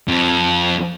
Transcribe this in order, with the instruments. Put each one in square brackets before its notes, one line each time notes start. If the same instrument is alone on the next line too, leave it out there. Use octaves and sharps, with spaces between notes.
[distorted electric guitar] F2